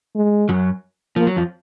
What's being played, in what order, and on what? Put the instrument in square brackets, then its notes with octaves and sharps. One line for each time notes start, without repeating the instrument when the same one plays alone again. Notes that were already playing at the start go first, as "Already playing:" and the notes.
[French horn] G#3
[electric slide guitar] F#2 F#3
[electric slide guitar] F3 [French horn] A#3
[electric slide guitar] F#3
F2 F3